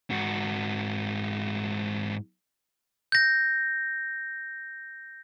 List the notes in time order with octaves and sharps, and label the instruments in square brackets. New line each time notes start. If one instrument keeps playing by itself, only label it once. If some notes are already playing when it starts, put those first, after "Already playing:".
[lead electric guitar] G#2 F#4
[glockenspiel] G6 A#6